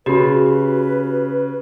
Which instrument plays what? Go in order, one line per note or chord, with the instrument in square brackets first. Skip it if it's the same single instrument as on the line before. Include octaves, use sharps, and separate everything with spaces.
[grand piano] C#3 [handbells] F#4 G4 [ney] B4